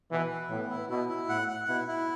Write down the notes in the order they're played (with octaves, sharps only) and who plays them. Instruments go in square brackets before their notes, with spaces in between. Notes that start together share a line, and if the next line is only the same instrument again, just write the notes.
[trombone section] B2 E3 [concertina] E4
[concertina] B4
[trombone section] A2 [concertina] B3
[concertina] E4
[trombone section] B2 [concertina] E4
[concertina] E4
[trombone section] A2 [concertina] F#5
[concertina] F#5
[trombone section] B2 [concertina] E4
[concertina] E4